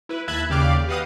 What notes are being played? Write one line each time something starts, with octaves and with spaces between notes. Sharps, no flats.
E4 B4
D#2 E5 A5 B5 F#6 G#6
D#2 C#3 G4 D5 F5 D6
G4 B4 D#5 F5 F#5 D#6